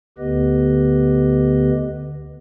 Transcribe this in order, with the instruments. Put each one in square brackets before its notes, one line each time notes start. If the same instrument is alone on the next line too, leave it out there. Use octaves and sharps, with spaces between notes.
[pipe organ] D2 D3 B3 G4 B4 D#5